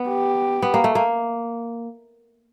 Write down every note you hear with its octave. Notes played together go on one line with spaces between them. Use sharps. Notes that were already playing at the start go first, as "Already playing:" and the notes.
Already playing: B3
G4
B3
A#3
A3
A#3